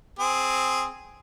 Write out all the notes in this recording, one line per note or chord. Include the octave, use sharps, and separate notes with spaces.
C4 G#4